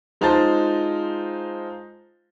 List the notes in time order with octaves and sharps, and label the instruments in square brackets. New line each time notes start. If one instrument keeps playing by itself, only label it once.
[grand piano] G#3 D#4 F4 C5 A5 A6